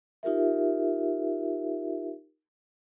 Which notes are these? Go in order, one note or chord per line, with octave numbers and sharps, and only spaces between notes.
D#4 F4 G4 A#4 E5